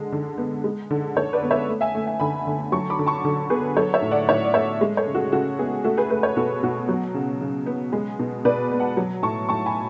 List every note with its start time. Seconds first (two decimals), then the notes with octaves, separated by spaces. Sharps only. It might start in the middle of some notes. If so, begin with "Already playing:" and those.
Already playing: D3 G#3
0.12 D3
0.38 B3
0.64 G#3
0.91 D3
1.16 D3 A4 C#5
1.33 B4 D5
1.43 B3
1.51 C#5 E5
1.69 A3
1.81 E5 G#5
1.95 A3
2.07 E5 G#5
2.20 D3 G#5 B5
2.47 D3
2.72 F#3 A5 C#6
2.90 B5 D6
2.99 D3
3.06 A5 C#6
3.25 D3
3.50 B3 G#4 B4
3.76 F#3 A4 C#5
3.94 C#5 E5
4.02 A2
4.11 D5 F#5
4.29 A2 C#5 E5
4.45 D5
4.54 A3 C#5 E5
4.81 G#3
4.97 A4 C#5
5.07 C#3
5.15 F#4 A4
5.32 C#3 F#4 A4
5.59 B3 G#4
5.84 A3 F#4 A4
5.97 G#4 B4
6.10 A3 G#4 B4
6.23 A4 C#5
6.36 B2 F#4 A4
6.63 B2 F#4
6.89 F#3
7.14 C#3
7.41 C#3
7.66 B3
7.92 G#3 G#4
8.19 B2
8.45 B2 B4 D5
8.71 B3
8.80 F#5 A5
8.97 F#3
9.23 A2 A5 C#6
9.49 A2 A5 C#6
9.66 G#5 B5